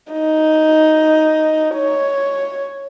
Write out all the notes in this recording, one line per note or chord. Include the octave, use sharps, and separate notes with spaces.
D#4
C#5